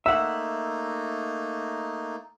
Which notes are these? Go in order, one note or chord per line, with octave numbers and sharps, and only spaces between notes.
A3 A#3 D#4 E5 F#5 E6